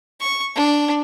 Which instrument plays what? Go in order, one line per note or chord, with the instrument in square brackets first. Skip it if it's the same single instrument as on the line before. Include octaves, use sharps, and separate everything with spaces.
[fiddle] C#6
D4